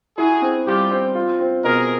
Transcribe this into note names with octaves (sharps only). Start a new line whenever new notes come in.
E4 F#4 G#4
C4
G3 F4 G4
C4
F4
C4
B2 G#4 A#4